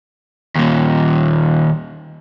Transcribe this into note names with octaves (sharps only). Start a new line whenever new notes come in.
D#2 A#2